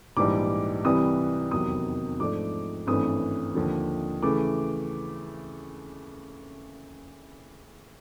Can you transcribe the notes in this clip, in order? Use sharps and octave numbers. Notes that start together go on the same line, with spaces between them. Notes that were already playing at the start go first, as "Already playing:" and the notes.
A#1 G#2 E3 G3 D6
C2 C3 E3 G3 D#6
F1 E2 C3 D#3 F#3 D#6
G#2 F3 A3 D4 D6
G#1 G2 E3 A3 C#4 D#6
D#2 D3 F3
C#3 E3 A3 D6